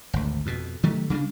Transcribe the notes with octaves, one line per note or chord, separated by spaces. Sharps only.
G#1 D2
F2 B2
D#3 F#3 G3 A3
C#3 G3 B3 D4